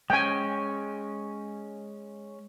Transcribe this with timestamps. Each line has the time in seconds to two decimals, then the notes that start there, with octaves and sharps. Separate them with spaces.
0.10 G#3 C#4 G5 G#5